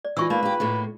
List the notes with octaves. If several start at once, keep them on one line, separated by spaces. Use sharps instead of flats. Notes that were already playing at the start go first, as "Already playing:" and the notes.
D5
E3 D#4 F4 C#6 E6
A#3 D#4 B4
A#3 G4
A2 A3 A#3